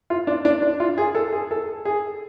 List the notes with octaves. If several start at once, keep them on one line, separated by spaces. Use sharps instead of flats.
F4
D4
D4
D4
F4
G#4
A4
G#4
A4
G#4